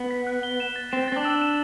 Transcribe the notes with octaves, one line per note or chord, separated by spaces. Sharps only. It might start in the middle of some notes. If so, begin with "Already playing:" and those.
Already playing: B3
B6
F#6
G7
E7
A6
C4 E7
C4 A6
D4
E6
E7